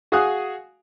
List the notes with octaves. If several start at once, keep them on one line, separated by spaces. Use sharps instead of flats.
F#4 G#4 F5 G#5 D#6 F#6